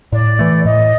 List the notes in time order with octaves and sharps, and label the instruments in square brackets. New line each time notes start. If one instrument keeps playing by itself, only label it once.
[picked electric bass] A2 [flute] D5
[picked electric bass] E3 A3
[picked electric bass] A2 [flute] D#5